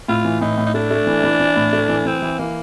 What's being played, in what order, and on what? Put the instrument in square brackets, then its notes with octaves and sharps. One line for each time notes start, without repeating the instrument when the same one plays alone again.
[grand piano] A2 [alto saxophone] F4
[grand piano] E3
[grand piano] A2 [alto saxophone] D#4
[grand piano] A2
[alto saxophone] D#4
[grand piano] A3 [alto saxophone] D4
[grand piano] A3
E3
E3
E3
A2
A3
E3
[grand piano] E3 [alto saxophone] C4
[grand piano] E3
[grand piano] E3 [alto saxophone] A#3